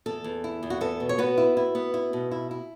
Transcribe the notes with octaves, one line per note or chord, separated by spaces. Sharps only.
E2 A4
E2
E4
E2
F#4
B3 A4
B2
C#5
B3 F#4 B4
E4
E4
B3
E4
B2
E4
E4